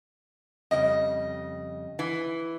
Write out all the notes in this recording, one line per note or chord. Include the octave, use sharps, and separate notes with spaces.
F2 C#3 G3 D#5
E3